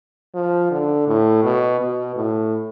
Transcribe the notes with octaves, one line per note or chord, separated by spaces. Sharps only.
F3
D3
A2
B2
B2
A2